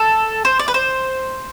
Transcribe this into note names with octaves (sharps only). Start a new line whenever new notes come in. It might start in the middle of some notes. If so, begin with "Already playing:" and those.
Already playing: A4
C5
D5
B4
C5